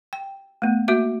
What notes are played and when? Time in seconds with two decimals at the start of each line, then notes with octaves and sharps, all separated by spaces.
0.13 G5
0.62 A3 B3
0.88 A#3 F#4 E5